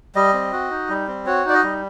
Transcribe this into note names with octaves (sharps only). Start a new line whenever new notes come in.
G3 D#5
C4
F#4
D#4
G3
C4
F#4 C#5
D#4 D5
D#5
G3